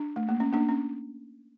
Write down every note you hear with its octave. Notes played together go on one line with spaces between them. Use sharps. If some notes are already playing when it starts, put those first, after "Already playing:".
Already playing: D4
A3
A#3
C#4
A#3 D4
C#4